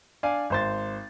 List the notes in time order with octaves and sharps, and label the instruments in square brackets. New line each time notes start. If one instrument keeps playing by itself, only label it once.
[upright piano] D4 D5 F5 G#5
G#1 C5 A6